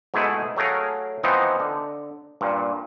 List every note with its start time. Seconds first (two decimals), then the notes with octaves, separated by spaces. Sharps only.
0.14 G#2 B2 G#3 A3 E4 G#4
0.56 F#3 A3 G#4 A#4 F5
1.23 E3 F3 B3 C4 D#4
1.60 D3
2.41 G2 A#2